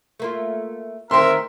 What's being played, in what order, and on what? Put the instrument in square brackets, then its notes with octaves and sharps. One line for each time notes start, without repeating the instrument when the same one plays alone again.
[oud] A3 A#3 F4
[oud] D2 D#3 [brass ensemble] C4 A#4 [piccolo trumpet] E5 [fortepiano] C6